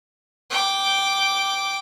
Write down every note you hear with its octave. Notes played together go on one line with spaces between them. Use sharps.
G5 D6